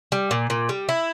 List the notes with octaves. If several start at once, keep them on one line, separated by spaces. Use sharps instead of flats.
G3
A#2
A#2
G3
E4